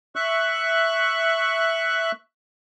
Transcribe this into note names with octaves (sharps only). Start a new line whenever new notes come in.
E5 C#6 F#6